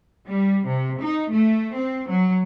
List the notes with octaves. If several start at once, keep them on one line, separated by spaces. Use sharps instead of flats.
G3
C3
D#4
A3
C4
F#3